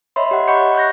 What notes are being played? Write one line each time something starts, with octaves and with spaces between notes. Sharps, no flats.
C#5 D#5 E5 B5 C6
G4 F#5
D#5 F#5 B5 C#6 G6 C#7
C#6 F#6 G6 A#6